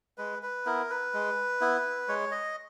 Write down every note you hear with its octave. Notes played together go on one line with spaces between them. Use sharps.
G#3 B4
B4
B3 E4 A#4
B4
G#3
B3 E4
G#3 C#5
D#5